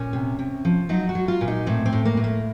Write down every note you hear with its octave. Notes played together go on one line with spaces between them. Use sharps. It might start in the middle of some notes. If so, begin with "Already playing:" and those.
Already playing: A#2 C#4
C3
C3
F3
F#3 D#4
F#4
F#3
F4
A#2
D#4
A2 C4
C4
A2
A#3
A2
A#3